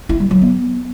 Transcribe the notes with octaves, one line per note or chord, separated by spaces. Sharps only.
E4
G3
F#3
B3